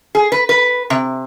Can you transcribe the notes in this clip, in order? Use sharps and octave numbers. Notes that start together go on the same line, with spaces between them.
G#4
B4
B4
C3